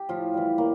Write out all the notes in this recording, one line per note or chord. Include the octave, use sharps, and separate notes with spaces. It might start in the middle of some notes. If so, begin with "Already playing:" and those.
Already playing: G4
A2 F3 F4
E3 G3
A2 A#3